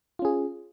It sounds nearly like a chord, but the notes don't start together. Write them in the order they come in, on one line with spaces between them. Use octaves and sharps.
F4 C#4 G#4